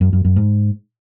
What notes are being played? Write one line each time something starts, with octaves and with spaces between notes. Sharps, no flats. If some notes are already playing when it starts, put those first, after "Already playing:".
F#2
F#2
F#2
G#2